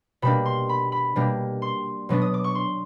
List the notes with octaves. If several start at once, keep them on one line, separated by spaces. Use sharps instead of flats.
B2 G3 A#3 D4 B5
C6
B5
B5
B2 G3 A#3 D4
C6
B2 F#3 B3 D4
D#6
D6
C#6
C6